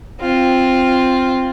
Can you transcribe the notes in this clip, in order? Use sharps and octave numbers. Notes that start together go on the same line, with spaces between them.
C4 F4